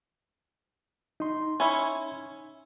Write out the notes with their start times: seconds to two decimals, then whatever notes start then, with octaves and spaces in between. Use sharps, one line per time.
1.20 D#4 C6
1.60 C#4 E4 C#5